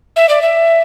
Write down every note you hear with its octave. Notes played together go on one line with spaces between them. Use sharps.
E5
D5
E5